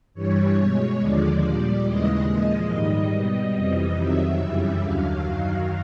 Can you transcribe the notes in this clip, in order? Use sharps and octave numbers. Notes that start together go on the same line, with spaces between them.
G2 E3 G3 C#5
B2 G#3
D#2 D3 F3 G#3 D5
A#2 G3
D#2 C#3 E3 G#3 D#5
A#2 F3 G#3
G#2 D#3 G3
B2 G3 D#5
F2 C3 E3 G3 D#5
F2 C3 D#3 F#3 E5
F#2 C#3 E3 G3
D#2 D3 F#3 F5
F#2 D#3 F#3